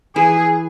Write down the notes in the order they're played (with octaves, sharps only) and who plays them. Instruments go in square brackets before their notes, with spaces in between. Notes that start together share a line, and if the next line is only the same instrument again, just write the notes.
[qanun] E3 E4 [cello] G#4